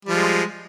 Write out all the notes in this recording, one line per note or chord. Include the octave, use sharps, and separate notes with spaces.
F3 G3 G#3